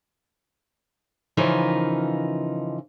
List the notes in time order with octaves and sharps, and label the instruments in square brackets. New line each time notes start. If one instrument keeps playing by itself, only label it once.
[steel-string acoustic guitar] C#3 E3 F3 D#4 A#4 B4